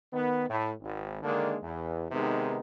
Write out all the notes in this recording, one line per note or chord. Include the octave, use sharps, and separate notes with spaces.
D#3 B3
A2
G#1
D3 D#3 G#3 A#3 D4
E2
C3 D#3 G#3 B3 D#4